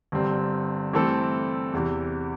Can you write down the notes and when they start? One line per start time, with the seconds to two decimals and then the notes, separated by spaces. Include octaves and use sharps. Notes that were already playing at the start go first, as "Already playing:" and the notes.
0.12 G1 G2 G3 C4
0.93 G2 E3 A3 C4 A4
1.73 E2 C3 E3